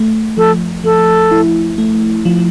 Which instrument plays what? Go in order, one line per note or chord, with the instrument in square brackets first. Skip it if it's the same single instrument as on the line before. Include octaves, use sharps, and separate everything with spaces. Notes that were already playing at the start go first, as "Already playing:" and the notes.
Already playing: [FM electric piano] A3
[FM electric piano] F3 [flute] A4
[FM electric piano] F3 [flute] A4
[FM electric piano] E4
A3
F3